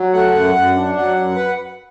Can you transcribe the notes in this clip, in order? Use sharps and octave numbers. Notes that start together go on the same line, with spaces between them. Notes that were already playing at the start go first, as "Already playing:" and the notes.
Already playing: F#3
A3 F#5
F#2
F#2
D4
F#3 F#5
F#2
B4